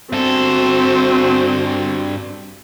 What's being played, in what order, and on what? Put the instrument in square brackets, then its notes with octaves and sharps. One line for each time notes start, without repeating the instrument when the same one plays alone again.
[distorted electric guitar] G2 A4 [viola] C4 F#4